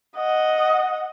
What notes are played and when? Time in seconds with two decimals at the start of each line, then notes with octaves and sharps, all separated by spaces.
0.17 D#5 F#5